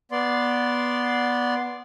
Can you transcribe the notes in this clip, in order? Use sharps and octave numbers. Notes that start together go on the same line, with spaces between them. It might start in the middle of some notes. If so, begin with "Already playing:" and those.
B3 D5 C6